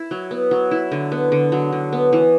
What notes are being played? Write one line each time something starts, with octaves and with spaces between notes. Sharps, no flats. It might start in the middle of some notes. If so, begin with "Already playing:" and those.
Already playing: E4
F#3
B3
F#3
E4
D3
B3
D3
F#3
D3
B3
E3